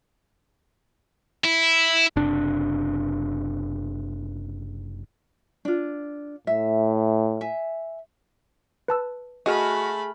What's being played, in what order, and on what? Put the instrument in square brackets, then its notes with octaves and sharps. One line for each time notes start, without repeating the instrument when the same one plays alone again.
[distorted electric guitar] E4
[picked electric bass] F#1 C3 D4
[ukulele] D4 F4
[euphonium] A2 [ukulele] E5
[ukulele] E5 G#5
[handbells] B4 A5 E6
[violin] A3 B5 [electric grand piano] F#4 F6 [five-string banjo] G#4 [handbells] D#5